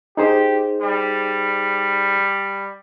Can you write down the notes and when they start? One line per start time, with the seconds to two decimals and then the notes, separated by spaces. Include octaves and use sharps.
0.17 D#4 G4 G#4 C5
0.81 G3